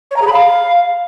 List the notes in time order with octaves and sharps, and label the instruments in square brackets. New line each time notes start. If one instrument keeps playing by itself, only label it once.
[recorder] C#5
A#5
G#4
B5
F5